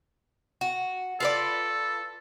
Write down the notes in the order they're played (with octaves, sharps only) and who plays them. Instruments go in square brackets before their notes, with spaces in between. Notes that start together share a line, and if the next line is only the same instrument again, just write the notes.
[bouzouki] F#4
[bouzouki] F4 B4 D5 [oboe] A4